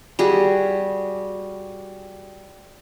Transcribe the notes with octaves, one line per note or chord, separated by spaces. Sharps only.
G3 F#4 G#4